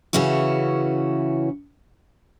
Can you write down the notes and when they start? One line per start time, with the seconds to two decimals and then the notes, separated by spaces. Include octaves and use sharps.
0.13 C#3 E3 C#4 E4 F#4